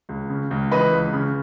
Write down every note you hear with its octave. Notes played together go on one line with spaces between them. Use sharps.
C#2
C#3
C#2
E3 B4 D#5
C#2
C#3